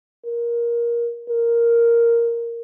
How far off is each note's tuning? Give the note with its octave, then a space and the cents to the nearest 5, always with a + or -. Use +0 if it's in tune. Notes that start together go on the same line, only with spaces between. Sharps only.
A#4 +15
A#4 +0